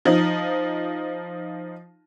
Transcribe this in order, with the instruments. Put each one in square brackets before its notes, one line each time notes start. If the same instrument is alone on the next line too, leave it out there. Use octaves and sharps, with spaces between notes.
[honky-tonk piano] F3 D#4